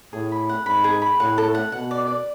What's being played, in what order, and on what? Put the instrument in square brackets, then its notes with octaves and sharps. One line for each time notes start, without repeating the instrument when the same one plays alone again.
[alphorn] A2 [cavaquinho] G#4
[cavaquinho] B5
F#5
[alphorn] G#2 [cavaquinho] B5
[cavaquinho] G#4
B5
[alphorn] A2 [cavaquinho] F#5
[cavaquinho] A4
F#5
[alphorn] B2 [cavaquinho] F#5
[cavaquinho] D5
D5